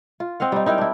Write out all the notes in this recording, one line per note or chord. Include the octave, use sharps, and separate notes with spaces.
F4
C4 D#5 F5 F#5
G3 D#4
D#4 E4 A#4 G5
D4 E4